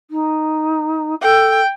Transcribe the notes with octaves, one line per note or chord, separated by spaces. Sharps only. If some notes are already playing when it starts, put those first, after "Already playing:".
D#4
A4 G5